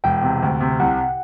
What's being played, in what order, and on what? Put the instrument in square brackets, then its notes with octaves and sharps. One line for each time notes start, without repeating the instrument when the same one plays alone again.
[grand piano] E1 [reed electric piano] G5
[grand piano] C3
D2
C3
[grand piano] C2 [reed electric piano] F#5